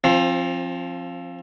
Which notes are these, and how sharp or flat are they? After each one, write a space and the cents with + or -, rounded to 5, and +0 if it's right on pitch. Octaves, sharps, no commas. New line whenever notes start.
F3 +0 C4 +30